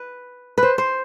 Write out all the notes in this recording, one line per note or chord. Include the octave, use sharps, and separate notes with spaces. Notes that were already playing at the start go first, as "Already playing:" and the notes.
Already playing: B4
B4
C5
C5